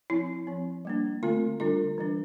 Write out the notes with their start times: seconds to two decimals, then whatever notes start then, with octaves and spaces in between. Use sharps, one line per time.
0.10 F3 C4 E4
0.47 F3 C4
0.85 G3 A#3 D4
1.23 D3 A3 C4 F4
1.60 D3 G3 D4 F4
1.98 E3 G3 D4